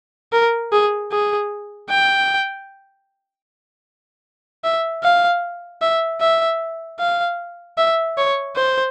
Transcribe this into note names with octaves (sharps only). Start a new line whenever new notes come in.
A#4
G#4
G#4
G5
E5
F5
E5
E5
F5
E5
C#5
C5